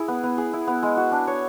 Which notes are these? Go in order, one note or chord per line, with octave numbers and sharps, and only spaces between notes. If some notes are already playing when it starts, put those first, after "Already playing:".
Already playing: E4 G#4
B3
B3
G#4
E4
B3
G#3
F#4
D4
C#5